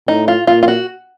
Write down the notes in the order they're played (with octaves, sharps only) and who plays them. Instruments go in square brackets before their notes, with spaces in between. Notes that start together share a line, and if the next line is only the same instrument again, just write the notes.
[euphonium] A2 [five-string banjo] D#4
[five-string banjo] F4
[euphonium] A#2 [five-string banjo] F4
[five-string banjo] F4
F#4